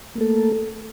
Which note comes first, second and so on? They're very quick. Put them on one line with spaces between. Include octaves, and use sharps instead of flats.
A#3 A3 A4